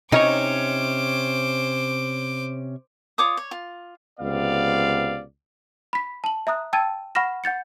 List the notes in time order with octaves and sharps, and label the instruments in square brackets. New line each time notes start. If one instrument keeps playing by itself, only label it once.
[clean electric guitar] C3 C#4 C#5 [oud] D#4 [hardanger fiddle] C5 D6
[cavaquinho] F4 C#5 D6 D#6
C#5
F4
[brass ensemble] C#2 C3 B3 D5 F5
[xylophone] B5 B6
A5 F#7
E5 A#5 D#6 F#6
G5 A5 E6 G#6 A6 D#7
F#5 B5 C#6 F6 A#6 E7
F#5 G6 A6 C#7